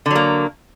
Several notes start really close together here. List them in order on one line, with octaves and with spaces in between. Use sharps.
D3 F#3 A#3